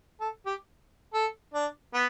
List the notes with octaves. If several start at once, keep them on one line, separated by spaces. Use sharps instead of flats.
A4
G4
A4
D4
B3